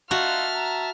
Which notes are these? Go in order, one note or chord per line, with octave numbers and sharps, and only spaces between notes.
D#4 F4 F#4 E5 A5 F6
A#5